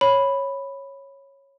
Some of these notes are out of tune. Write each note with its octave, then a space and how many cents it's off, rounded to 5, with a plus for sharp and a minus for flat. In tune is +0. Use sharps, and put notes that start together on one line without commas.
C#5 -10 B5 +0